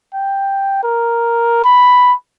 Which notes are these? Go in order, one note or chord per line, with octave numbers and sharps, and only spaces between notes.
G5
A#4
B5